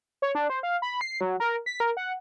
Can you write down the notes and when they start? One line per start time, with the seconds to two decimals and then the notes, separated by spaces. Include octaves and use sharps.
0.22 C#5
0.35 D4
0.50 C5
0.63 F5
0.82 B5
1.01 C7
1.21 F#3
1.40 A#4
1.66 B6
1.80 A#4
1.97 F#5